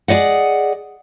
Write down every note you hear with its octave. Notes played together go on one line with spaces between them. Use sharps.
G#4 D5 D#5 F#5